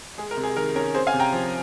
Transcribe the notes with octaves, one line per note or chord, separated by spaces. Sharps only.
G#3 G#4
A#4
C3
G#4
D#3 A#4
C#4 A#4
C4 G#4 C5
F5 G#5
C3
G5 A#5
F3